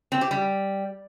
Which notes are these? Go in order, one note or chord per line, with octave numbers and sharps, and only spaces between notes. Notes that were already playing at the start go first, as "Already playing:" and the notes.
C4
G4
G3